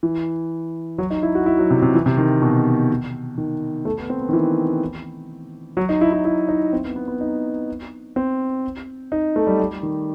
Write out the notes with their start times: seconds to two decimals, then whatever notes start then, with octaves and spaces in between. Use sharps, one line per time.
0.03 E3
0.98 F#3
1.10 D#4
1.23 E4
1.35 F#4
1.46 E4
1.59 F#3
1.70 C3
1.82 C3
1.94 E3
2.06 C3
2.18 D#3
2.42 B2
3.38 D#3
3.85 A3
3.98 B3
4.10 C4
4.21 B3
4.29 D#3
4.33 E3
5.77 F#3
5.89 D#4
6.01 E4
6.13 E4
6.25 E4
6.49 D#4
6.73 C4
6.84 B3
6.96 B3
7.08 B3
7.21 D#4
8.16 C4
9.12 D#4
9.36 A3
9.47 G3
9.60 G3
9.83 D#3